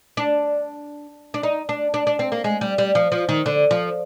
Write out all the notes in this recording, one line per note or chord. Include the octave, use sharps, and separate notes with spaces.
D4
D4
D#4
D4
D4
D4
C4
A#3
G#3
G3
G3
F3
F3
D#3
D3
F3